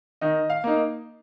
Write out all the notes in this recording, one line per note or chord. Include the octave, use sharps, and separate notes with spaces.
D#3 D#5
F5
A#3 D#4